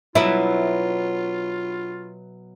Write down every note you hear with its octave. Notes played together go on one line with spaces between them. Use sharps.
B2 F#3 B3 E4 F4